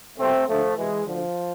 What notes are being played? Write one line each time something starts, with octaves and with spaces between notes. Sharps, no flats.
C2 B2 A3 C4
D2 D3 F3 A3
C2 B2 E3 G#3
D2 D3 F3